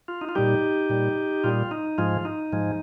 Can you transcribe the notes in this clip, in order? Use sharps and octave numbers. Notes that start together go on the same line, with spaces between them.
F4
D#4
F4
A#2 G3 D#4 G4
A#2 G3
A#2 G3 F4
D#4
G#2 F3 G#3 F4
D#4
G#2 F3 G#3